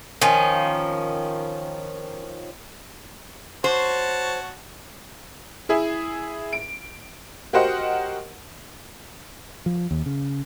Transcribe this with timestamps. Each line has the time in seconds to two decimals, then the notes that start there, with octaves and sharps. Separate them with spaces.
0.22 D#3 F3 C#4
3.64 F#4 C5 C#5 A5
5.69 E4 G#4 E5
6.53 D7
7.53 F#4 G4 A#4 C5 D#5 F#5
9.66 F3
9.91 D#2
10.06 C#3